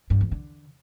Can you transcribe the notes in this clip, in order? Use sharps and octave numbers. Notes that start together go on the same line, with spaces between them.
G2
E2
D3